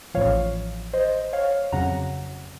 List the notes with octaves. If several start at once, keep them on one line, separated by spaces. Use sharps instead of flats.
A1 A2 F3 C#5 F5
C5 D#5
C#5 F5
F2 C#3 F#3 F#5 A#5